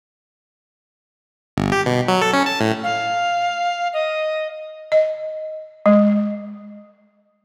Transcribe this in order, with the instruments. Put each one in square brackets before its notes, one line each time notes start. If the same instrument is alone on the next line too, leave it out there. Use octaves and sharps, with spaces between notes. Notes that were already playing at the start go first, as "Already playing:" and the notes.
[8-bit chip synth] G1
G4
B2
F#3
A4
C#4
A5
A2
[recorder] F5
D#5
[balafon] D#5
G#3